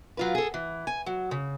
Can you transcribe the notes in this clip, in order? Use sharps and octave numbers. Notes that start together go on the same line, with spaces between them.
F#3 F4 B4
G#4 A4
E3
G#5
F#3
C#3